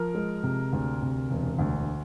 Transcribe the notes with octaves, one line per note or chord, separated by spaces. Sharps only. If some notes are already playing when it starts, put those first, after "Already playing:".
Already playing: F3 A#4
G#3
C3
D2
C3
E1
D2